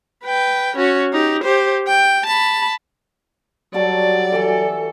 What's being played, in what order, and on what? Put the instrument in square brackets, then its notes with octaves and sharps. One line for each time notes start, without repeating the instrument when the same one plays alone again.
[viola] B4 G5
C#4 F#4
D#4 G4
G4 C5
G5
A5 B5
[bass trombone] F#3 [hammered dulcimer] G3 F#4 A4 [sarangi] D5
[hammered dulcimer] E3 E5 G#5 [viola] A4